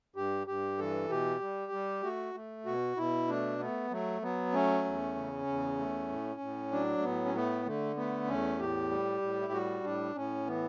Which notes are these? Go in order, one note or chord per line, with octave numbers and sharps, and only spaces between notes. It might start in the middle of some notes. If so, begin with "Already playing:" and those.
G2 G4
G2 G4
E3 A4
B2 G4
G3
G3
A3 F#4
A3
B2 F#4
B2 E4
A3 D4
A3 B3
F#3 A3
F#3 B3
A3 C#4
E2
C#3
E2
A3
A2
A2
F#3 D4
A3
A2 B3
C#4
A3 B3
D3 A3
A3 B3
E2 C#4
A2 G4
G3
A2
E4
G3 F#4
A2 D4
A2 C#4
E3 B3